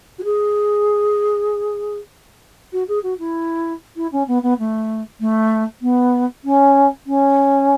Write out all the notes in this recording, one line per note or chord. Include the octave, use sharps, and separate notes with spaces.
F#4
G#4
F#4
G#4
F#4
E4
E4
C#4
B3
B3
A3
A3
B3
C#4
C#4